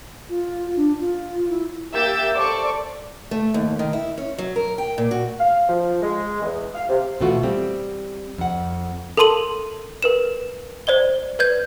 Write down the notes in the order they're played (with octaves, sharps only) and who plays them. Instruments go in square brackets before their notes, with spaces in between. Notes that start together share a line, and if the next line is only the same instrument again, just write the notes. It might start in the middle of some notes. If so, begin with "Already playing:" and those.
[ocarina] F4
D4
F4
E4
[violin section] A#3 G4 E5 E6 G6 A6
A4 C5 D5 C#6 D6
[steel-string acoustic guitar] A3
D#2
D#3
E4
C#4
F#3
A#4
G5
A#2
F#4
[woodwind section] F5
F3
G#3
E2
F5
C3
[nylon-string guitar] B2 E3 A3 F4 F#4
G3 C4
F2 F#5
[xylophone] A4 A#4 A5 C6 D#7 F#7
A#4 B4 E7
C5 D5 D#5 G7
B4 D5 G6 G#6